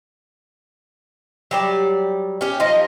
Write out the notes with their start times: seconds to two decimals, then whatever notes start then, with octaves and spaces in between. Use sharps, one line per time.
1.51 F#3 G3 D5
2.41 C#4 G4
2.60 F3 D#4 F4 D#5